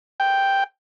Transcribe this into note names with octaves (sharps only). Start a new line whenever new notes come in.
G5